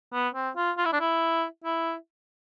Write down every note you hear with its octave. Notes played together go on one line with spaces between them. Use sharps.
B3
C4
F4
F4
E4
D4
E4
E4